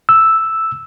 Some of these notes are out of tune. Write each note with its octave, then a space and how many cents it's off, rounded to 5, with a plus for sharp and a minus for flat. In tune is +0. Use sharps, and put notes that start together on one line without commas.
E6 +0